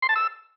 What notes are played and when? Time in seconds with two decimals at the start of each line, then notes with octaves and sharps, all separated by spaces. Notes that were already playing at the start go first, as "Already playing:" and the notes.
0.02 C6
0.09 A5
0.16 E6